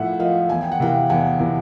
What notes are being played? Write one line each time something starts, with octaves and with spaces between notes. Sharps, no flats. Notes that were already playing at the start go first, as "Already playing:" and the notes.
Already playing: A2 F3 E5 F#5
F3 D#5 F5
E2 G#5
G5
F#5
C3 E3 F5 G5
E2 F#5 G#5
C3 E3